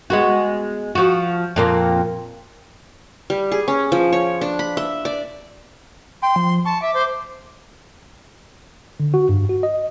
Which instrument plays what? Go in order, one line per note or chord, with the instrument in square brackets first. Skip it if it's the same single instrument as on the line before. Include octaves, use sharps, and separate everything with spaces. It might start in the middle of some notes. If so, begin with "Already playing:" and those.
[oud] G#3 B3 F#4
F3 F#4
F2 A#2 A#3
[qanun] G3
G#4
C#4
F3
C#5
D4
B5
E5
D5
[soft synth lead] G5 [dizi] C6
[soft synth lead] F3
[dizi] A5 [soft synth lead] C#6
[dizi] E5 [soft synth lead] D6
[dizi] C5
[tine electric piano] D3
F#4
G2
F#4
D#5